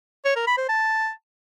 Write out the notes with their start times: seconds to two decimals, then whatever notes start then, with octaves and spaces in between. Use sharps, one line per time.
0.25 C#5
0.36 A#4
0.47 B5
0.58 C5
0.69 A5